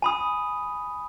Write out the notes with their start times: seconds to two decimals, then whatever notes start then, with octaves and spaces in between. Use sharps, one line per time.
0.02 G#5 B5 D#6